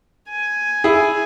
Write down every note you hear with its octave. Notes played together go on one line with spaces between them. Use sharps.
G#5
E4 G#4